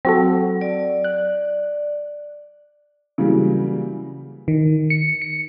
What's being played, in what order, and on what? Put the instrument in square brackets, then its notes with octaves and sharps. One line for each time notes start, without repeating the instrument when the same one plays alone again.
[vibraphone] F#3 [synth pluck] C4 F#4 A4
[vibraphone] D5
[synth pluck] F#6
[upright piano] C#3 E3 F#3 G3 A#3
[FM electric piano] D#3
C#7
C#7